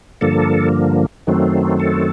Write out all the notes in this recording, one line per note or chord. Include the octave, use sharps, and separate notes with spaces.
G2 D3 F3 A#3 A4
F#2 D#3 F#3 A3 C4
A4